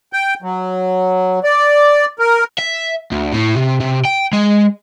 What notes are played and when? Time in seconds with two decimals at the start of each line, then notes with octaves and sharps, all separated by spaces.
0.13 G5
0.42 F#3
1.44 D5
2.19 A#4
2.58 E5
3.12 D2
3.32 A2
3.55 C3
3.80 C3
4.05 G5
4.33 G#3